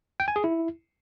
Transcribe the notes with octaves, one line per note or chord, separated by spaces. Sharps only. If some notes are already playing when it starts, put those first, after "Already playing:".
G5
G#5
G#4
E4